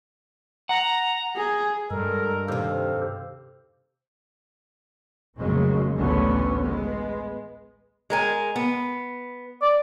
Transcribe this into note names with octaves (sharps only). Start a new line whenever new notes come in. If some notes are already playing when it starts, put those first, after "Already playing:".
F#5 A#5
G#4
G2 G#3 A4 A#4
D#2 C3 G4 A4 C5 F5
F1 C#3 F#3 G#3 A#3 C#4
A1 D2 D3 B3 C#4
G#3 B3
G#3 A#4 G#5
B3
D5